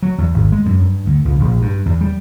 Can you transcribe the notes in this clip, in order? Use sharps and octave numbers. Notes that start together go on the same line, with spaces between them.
F#3
E2
G#1
G#3
F#2
G2
D2
C#2
A#1
G2
E2
G3